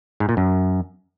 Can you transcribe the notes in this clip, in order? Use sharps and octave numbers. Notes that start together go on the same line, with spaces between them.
G#2
A#2
F#2